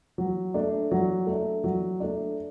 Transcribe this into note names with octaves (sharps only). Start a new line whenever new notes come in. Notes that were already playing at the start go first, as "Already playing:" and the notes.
F#3
A3 D4
F#3
A3 D4
F#3
A3 D4